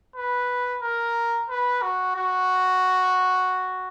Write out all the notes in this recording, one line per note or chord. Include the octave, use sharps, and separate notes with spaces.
B4
A#4
B4
F#4
F#4